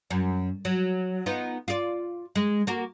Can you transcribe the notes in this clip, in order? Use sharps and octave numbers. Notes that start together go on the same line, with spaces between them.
F#2
F#3
B3 D#4 F4
F4 D5
G#3
A#3 F#4 A#4